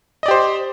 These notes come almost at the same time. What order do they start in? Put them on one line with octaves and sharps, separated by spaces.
D#5 D5 G4 C5